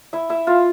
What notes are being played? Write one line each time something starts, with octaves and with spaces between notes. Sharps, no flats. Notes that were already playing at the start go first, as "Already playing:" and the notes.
E4 E5
E4 E5
F4 F5